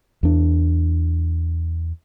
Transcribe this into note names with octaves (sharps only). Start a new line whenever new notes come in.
E2 D4